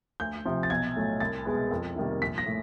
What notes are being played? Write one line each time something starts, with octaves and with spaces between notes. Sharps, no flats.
D2 G6
C3 F3
A6
B1 G#6
A2 F#3 A3
C2 A6
B2 G#3 B3
F2
C3 D#3 G3 A#3
A#1 B6
A#6
A2